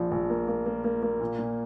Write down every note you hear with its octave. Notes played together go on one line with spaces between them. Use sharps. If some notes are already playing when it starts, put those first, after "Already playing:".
Already playing: A#1 F3
A#1
A#3
A#3
A#3
A#3
A#3
A#2
A#2